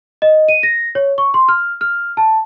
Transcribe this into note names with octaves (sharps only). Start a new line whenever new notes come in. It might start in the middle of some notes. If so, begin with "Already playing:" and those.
D#5
D#7
A#6
C#5
C#6
C6
F6
F6
A5